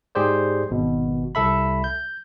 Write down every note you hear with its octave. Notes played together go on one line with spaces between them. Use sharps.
G#2 G4 G#4 C5 D5
G#1 B2
C2 A4 E5 B5
G6